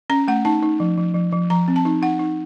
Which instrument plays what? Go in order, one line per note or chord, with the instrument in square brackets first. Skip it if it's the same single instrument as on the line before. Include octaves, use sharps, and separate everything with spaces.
[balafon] C#4 A#5
A3 F#5
D#4 A5
D#4
F3
F3
F3
F3
F3 A#5
C4
A5
D#4
D#4 F#5
D#4